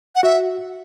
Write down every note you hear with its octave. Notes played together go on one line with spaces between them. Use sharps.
F#5
F#4 E5